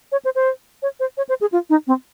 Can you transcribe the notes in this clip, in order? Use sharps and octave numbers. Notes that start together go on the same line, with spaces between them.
C#5
C5
C5
C#5
C5
C#5
C5
G#4
F4
D#4
C4